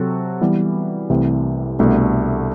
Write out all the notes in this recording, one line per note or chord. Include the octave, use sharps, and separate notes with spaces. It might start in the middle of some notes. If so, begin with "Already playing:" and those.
Already playing: C3 F#3 C4 F#4 A4
E3 G3 B3
C2 C3 E3 A3 C4
C2 B2 A3 D4